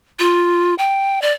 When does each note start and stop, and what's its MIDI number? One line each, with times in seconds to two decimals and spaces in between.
0.19 0.75 65
0.78 1.22 79
1.22 1.32 74